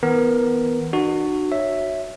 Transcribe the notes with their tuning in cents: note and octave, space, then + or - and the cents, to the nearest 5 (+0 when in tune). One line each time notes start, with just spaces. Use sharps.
E3 -35 B3 +0 A#4 +0
D4 +45 F#4 +0
C#5 +0 E5 +0